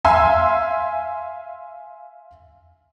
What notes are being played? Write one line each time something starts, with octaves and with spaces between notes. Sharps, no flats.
E5 F5 G#5 C6 E6